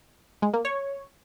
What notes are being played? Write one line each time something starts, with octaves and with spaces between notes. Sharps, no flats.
G#3
A#3
C#5